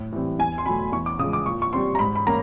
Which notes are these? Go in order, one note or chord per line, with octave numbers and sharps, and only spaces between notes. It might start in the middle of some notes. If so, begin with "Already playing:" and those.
Already playing: A2
E3 G3 C4
E2 G#5
C6
B2 F#3 A3 B5
E2 C#6
D6
C#3 F3 G#3 D#6
D6
A#2 C#6
C#6
G3 C4 C6
A#5
G#2 B5
B5
A#3 C#4 A#5